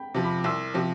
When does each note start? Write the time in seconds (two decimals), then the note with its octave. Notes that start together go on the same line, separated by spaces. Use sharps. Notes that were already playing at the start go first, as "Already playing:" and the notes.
Already playing: G5 B5
0.14 C3 F3
0.24 B5 D6
0.38 D6
0.44 C2 C6 E6
0.74 C3 F3